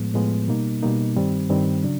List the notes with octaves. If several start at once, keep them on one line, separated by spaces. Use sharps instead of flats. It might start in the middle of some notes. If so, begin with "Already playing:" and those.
Already playing: A2 F3 G#3 B3
A2 F3 G#3 B3
B2 G3 A#3 D#4
B2 G3 A#3 D#4
G2 D#3 G3 C4
G2 D#3 G3 C4
C#3 F#3 D4